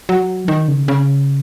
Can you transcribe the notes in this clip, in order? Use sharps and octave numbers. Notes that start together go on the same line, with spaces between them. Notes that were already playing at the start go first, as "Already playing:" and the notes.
F#3
D#3
C#3
C#3